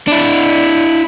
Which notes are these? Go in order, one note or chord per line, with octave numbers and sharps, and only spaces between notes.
D4 E4